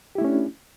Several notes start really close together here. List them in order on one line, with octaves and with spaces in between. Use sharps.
G4 E4 A3 C#4 D4